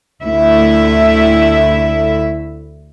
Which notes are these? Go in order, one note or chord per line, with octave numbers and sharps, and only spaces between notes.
D2 A3 E4 E5